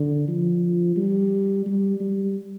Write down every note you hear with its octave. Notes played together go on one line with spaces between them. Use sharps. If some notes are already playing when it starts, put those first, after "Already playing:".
Already playing: D3
F3
G3
G3
G3